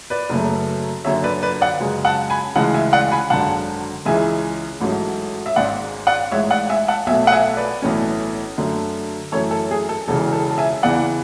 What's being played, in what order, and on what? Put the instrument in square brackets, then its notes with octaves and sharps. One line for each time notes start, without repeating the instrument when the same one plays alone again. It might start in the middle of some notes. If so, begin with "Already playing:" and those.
[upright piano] B4 D5
F#1 F#2 C#3 F#3 A3
F#1 F#2 D3 C#5 E5
B4 D5
B4 D5
D5 F#5
F#2 C#3 G#3 C#4
F#5 A5
G#5 B5
D2 C#3 E3 G#3 F#5 A5
E5 G#5
D5 F#5
G#5 B5
G#1 F#2 D3 F#5 A5
C#2 C#3 E3 G#3 E5 G#5
A1 G#2 F#3 A3 C#4
E5
G#1 G#2 G#3 C#4 D5 F#5
D5 F#5
A1 G#2 G#3 C#5 E5
D5 F#5
E5 G#5
F#5 A5
B1 B2 A3 E5 G#5
F#5
E5 G#5
B4 D5
B1 A2 E3 A3 C#4
F#2 D3 A3
F#2 E3 A3 C#4 A4 C#5
A4
G#4
A4
E1 E2 C#3 E3 A4
A4
A5
E5 G#5
E2 C#3 E3 B3 D5 F#5